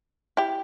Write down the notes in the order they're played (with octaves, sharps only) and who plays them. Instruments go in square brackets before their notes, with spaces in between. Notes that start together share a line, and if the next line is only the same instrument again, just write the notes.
[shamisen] E4 G4